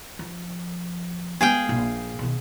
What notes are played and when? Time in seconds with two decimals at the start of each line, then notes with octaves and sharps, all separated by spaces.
0.19 F3
1.41 G#3 B3 G#4 F5 G5
1.69 A#1 A#2
2.19 B2 D#3